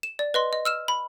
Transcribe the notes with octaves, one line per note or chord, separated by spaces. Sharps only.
E7
D5
B4 D#5 C6
D#5
E6 F6 E7
B5